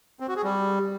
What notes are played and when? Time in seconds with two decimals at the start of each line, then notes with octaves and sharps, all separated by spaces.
0.20 C4
0.28 F#4
0.36 G#4
0.44 G3